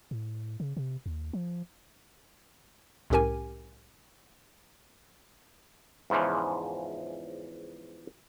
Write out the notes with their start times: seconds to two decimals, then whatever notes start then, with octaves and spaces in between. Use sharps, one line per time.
0.11 A2
0.60 C#3
0.77 C3
1.06 D#2
1.33 F3
3.10 C2 A2 C#4 G4 A#4 G#5
6.10 E2 G#2 C#3 E3 F3